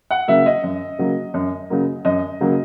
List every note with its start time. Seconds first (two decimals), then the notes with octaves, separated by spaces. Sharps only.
0.11 F#5
0.28 C#3 F#3 A#3 E5
0.46 D#5
0.63 F#2
0.98 C#3 F#3 A#3
1.34 F#2
1.70 C#3 F#3 A#3
2.05 F#2 D#5
2.40 C#3 F#3 A#3